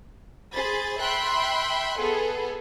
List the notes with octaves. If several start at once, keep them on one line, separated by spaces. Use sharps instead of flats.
G#4 C5 B5 A6
E5 G5 B5 C6 F#6
B3 G#4 A4